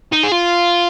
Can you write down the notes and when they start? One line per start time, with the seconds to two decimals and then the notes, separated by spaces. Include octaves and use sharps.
0.12 D#4
0.23 G#4
0.32 F4